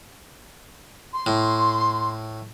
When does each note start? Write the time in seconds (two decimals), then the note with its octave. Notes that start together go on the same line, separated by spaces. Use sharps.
1.13 C6
1.26 A2